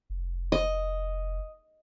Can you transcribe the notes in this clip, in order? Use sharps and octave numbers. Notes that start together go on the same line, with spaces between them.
F1
D#5